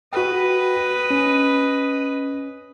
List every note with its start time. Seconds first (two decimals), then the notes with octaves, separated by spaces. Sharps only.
0.13 F#4 B4 D#5 G5
1.10 C#4